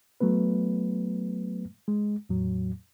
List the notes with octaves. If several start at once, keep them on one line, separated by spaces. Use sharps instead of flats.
F#3 A3 B3 B4
G#3
E2 A2 F#3